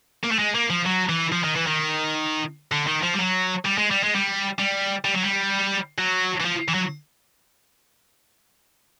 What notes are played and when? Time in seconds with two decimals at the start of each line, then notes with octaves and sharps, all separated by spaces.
0.23 A#3
0.31 A3
0.39 G#3
0.55 A#3
0.70 F3
0.86 F#3
1.09 E3
1.32 F3
1.44 D#3
1.56 E3
1.67 D#3
2.72 D3
2.87 D#3
3.03 F3
3.14 G3
3.19 F#3
3.65 G3
3.78 G#3
3.91 G3
4.03 G#3
4.15 G3
4.59 G3
5.05 G3
5.14 F#3
5.23 G3
5.98 F#3
6.40 E3
6.45 F3
6.68 E3
6.74 F#3